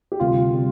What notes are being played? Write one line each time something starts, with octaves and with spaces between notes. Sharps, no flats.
G4
D2 C3 G3 F4
C3 G3